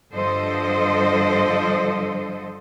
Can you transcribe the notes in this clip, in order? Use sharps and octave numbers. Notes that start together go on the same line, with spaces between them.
G2 D3 F3 A4 C5 D#5